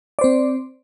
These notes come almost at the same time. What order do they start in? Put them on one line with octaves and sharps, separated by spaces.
D5 C5 C4